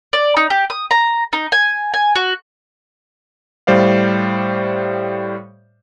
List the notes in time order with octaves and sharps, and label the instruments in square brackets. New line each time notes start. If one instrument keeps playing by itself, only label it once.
[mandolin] D5
D#4
G4
D#6
A#5
D#4
G#5
G#5
F#4
[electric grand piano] A2 G3 C5 D5 F5